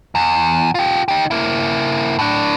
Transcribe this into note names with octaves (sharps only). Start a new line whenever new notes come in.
E2
F4 G4
D#4 G4
A#3 E4
A2 D4